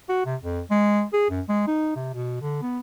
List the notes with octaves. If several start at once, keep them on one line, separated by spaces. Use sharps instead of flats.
F#4
C3
F2
G#3
G#4
F#2
G#3
D#4
C3
B2
D3
B3